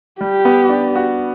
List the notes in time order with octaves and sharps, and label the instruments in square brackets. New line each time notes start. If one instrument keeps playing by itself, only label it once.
[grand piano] G3 [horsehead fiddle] G4
[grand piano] B3
D4
F#4